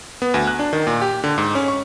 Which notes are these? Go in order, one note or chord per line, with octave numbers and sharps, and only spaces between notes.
B3
D2
F#6
D4
D#3
A#2
G4
D3
G#2
C#4
C#6